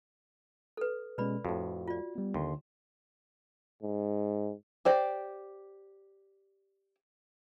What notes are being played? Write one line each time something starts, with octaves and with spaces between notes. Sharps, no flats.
A4 B4
B2 G#3 C#4 B4 D5 B5
F2 A2 F#4
F4 D5
G3 B3
D#2 D3 C6
G#2
G4 C5 D5